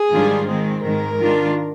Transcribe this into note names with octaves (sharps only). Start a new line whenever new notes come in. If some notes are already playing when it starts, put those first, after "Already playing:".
Already playing: G#4
G#2 D#3 G3 D4 F4
D#3 G#3 C4
G#2 D#3 G#3 A#4
D#3 G#3 D4 F4